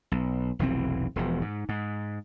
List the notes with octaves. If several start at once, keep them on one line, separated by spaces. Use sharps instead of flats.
B1
F1 B1 E3 C4
E1 E2 F3
G#2
G#2